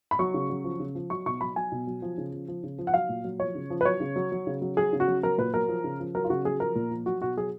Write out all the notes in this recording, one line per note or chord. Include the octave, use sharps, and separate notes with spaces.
B5
F#3 C#6
C#3
F#3
F3
C#3
F3
F#3 C#6
B2 C#6
F#3 B5
F#3 G#5
B2
F#3
F3
C#3
F3
F3
C#3
F3
F#5
F#3 F5
A#2
F#3
F3 C#5
C#3
F3
B4
F#3 C#5
C#3
F#3
F#3
C#3
F#3
F#3 G#4
C#3
F#4
F#3
F#3 A#4
A#2 B4
F#3 A#4
F3
C#3
F3
F#3 A#4
F4
C#3 F#4
F#3 G#4
F3 A#4
A#2
F3
F#3 F#4
B2 F#4
F#3 G#4